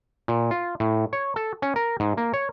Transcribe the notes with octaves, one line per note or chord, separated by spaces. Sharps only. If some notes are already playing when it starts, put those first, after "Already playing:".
A#2
F4
A2
C#5
A4
C#4
A#4
G#2
A#3
C#5